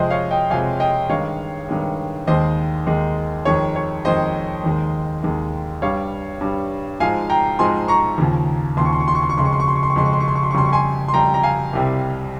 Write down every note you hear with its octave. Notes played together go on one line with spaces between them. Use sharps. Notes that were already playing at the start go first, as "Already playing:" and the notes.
Already playing: F2 C3 F3 G#3 C5 D#5
C#5 F5
D#5 G5
F2 C3 F3 G#3 F5 G#5
D#5 G5
G2 D#3 G#3 C#5 F5
G2 D#3 G#3
D#2 D#3 G#3 C5 D#5
D#2 D#3 G#3
F2 D#3 G#3 C#5
C#5
F2 D#3 G#3 C5 D#5
D#2 D#3 G#3
D#2 D#3 G#3
G2 G3 C#5 F5
G2 G3
G#2 F3 G#3 F5 G#5
G5 A#5
G#2 F3 G#3 G#5 C6
A#5 C#6
D#2 C#3 F3
D#2 C#3 F3 C6
C#6
C6
C#6
C6
C#6
C6
C#6
F2 C#3 G#3 C6
C#6
C6
C#6
C6
C#6
C6
C#6
F2 C#3 G#3 C6
C#6
C6
C#6
C6
C#6
C6
C#6
F2 C#3 G3 C6
C#6
G#5 C6
C6
F2 C#3 G3 G5 A#5
A#5
F5 G#5
C2 C3 G3